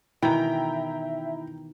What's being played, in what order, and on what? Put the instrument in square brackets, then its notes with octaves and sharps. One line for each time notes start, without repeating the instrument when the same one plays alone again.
[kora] B2 D#3 E3 [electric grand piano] E4 [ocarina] E5 [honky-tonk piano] G5 A#5